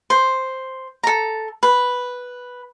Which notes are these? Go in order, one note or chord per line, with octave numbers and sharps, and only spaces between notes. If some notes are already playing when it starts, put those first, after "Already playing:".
C5
A4 A#5
B4